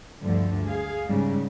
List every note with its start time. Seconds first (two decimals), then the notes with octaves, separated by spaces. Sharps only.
0.22 D2 G2 D3 F3
0.66 G#4 F5
1.07 G#2 C#3 G3 G#3